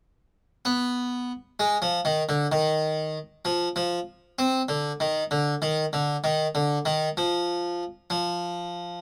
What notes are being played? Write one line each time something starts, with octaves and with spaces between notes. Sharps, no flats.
B3
G#3
F3
D#3
D3
D#3
F3
F3
C4
D3
D#3
D3
D#3
D3
D#3
D3
D#3
F3
F3